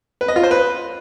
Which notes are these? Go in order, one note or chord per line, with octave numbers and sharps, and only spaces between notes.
B4
D#5
F4
C5
B4